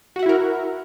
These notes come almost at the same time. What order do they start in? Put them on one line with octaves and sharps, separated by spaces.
F#4 F#5 E5 E4 A#4